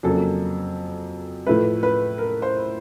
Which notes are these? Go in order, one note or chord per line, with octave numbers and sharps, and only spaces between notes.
F2 C#3 F#3 A#3 A4
A2 F3 A3 B4
B4
A#4
C5